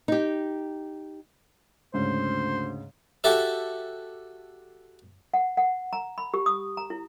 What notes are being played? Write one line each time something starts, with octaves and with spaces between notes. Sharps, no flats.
D#4 G4
D2 G#2 C#3 C5
F#4 G4 A4 E5
F#5
F#5
A#5
B5
G4
D#6
A#5
E4